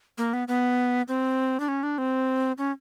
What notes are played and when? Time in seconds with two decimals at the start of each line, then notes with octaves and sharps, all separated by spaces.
0.18 A#3
0.33 B3
0.48 B3
1.08 C4
1.60 D4
1.68 C#4
1.83 D4
1.98 C4
2.58 C#4